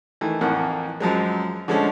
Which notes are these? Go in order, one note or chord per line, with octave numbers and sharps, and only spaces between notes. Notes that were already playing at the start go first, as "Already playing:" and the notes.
D#3 E3 A3
F2 A2 E3 A#3 F#5
F#2 F3 F#3 G#3
D3 F3 G#3 A3 C#4